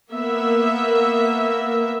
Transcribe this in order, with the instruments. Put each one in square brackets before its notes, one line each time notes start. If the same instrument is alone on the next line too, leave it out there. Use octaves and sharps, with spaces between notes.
[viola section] A#3 B3 E5